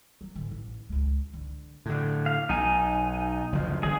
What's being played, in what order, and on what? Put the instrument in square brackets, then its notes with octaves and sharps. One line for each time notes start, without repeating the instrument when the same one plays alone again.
[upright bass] F#3
G#2 D3
A1
C#2 G#3
D3
[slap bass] A2 D3
[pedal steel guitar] F5
[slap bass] B1 [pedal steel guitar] D#4 G#5
[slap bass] F#1 D2 F3
[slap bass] G1 [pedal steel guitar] G#4